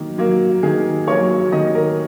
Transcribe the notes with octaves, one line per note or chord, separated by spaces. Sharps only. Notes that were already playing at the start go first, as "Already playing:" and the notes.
Already playing: D#3 F#3 A#3
F#3 A#3
D#3 G#4
F#3 A#3 C#5
D#3 D#5
A#4